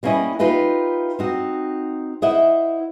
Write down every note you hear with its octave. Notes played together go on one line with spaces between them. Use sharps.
G3 A#3 B3 C#4 E4 D#5
D#4 F4 G4 B4 D#5 E5
C4 D#4 F#4
E4 C5 D#5 E5 F#5